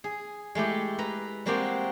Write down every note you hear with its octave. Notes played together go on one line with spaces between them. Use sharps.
G#4
G#3 A3 E4 G4
B4 A#5
G3 G#3 A#3 C4 F#4 G4